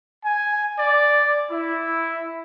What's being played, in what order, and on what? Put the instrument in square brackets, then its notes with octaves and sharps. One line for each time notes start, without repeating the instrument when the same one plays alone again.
[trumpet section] G#5
D5
E4